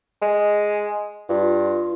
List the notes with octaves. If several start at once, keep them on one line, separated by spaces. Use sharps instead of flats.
G#3
G2 F4